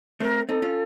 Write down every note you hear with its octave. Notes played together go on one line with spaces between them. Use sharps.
A3 C4 A#4
C4 D#4 A4
C#4 F4